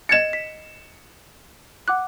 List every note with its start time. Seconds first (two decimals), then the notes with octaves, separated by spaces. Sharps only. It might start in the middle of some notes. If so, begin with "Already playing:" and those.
0.09 D#5 G#6 A6 C#7 E7
0.33 B6
1.88 F#5 D6 F#6